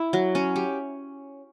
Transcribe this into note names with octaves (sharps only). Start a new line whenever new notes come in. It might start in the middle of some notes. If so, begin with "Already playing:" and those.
Already playing: E4
F#3
C#4
G4